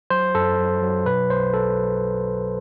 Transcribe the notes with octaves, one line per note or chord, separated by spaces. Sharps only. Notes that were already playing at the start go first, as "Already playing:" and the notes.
F#3 C5
F#2 A4
F#3
F#3
B2 B4
B1 C5
B1 A4